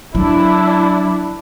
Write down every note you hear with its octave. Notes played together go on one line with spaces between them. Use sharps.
F#3 D4 E4